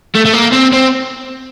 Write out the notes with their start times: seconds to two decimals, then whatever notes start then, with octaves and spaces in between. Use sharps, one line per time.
0.15 A3
0.25 A3
0.34 A#3
0.53 C4
0.74 C4